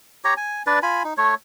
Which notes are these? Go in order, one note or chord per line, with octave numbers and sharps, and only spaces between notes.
G4 C#5 A#5
G#5
D4 B4 D5
F4 G#5 B5
D#4
A3 C#5